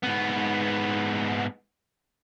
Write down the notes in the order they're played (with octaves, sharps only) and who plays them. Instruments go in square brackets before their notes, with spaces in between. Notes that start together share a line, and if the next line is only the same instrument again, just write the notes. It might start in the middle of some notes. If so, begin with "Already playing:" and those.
[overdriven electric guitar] G#2 B3